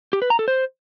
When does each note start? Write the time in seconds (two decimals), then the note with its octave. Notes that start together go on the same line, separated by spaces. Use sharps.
0.13 G4
0.22 B4
0.30 A#5
0.39 A4
0.48 C5